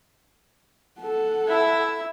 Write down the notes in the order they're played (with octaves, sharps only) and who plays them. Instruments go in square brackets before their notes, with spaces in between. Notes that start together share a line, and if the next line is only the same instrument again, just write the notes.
[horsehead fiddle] A4 F#5
[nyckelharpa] E4 E5